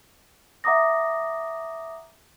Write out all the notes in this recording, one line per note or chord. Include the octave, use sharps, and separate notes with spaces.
E5 F#5 A#5 D6 D#6 A#6